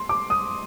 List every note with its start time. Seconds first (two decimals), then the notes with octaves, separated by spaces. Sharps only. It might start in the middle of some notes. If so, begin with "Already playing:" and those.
Already playing: C6
0.09 D6
0.30 D#6